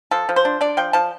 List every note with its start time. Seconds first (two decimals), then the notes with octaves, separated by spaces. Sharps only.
0.11 F3 A4
0.29 F3
0.36 C5
0.45 D4
0.61 D4 D5
0.77 F3 G5
0.93 F3 A5